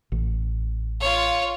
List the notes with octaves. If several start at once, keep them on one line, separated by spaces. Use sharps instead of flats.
A1
F4 C#5